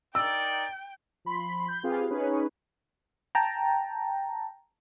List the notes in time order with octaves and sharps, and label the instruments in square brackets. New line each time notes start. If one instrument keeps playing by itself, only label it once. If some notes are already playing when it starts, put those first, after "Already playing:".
[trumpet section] D#4 A#4 D5 [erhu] G5 [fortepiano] E6
[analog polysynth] F3 B5 C6
G6
C4 F4 G4 G#4 B4 F5
C#4 D#4 G#4 B4 C#5
[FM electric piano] G5 A5 A#5